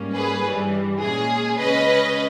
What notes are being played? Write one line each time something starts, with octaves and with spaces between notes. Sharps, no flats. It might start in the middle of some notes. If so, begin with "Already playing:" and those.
Already playing: G#2 G3 A#3 C#4
G#4 B4
G2 E3 G3
A#2 G#3 C#4 G#4
C#3 G#3 C#4 B4 D#5